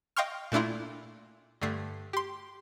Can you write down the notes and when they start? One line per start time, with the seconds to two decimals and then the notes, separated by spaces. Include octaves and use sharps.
0.16 D#5 F5 G5 C6 C#6 F6
0.52 A#2 A3 D4 E4 F4
1.61 G2 D3 A3 C7
2.13 G4 C6